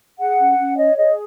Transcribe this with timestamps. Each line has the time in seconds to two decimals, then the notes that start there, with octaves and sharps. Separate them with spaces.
0.19 G#4 F#5
0.38 C#4
0.58 C#4
0.77 C#5 D#5
0.96 G#4 D#5